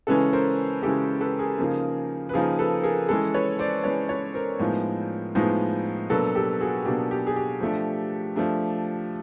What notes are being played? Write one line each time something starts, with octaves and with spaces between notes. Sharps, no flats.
C#3 E3 G#3 C#4 A4 B4
A#4 C5
C#3 E3 G#3 C#4 G4 A4
A4 B4
G#4 A#4
C#3 F3 A#3 D#4
B4
C#3 F3 A#3 D#4 G#4 A#4
A4 B4
G#4 A#4
E3 G#3 C#4 A4 B4
B4 C#5
C5 D5
E3 G#3 C#4 B4 C#5
B4 C#5
A#4 C5
A2 F3 G#3 B3 D#4
A2 F3 G#3 B3 D#4
B2 F#3 A#3 D4 A4 B4
G4 A4
F#4 G#4
B2 F#3 A#3 D4 G4
G4
G#4
G4
F3 A3 D4
F3 A3 D4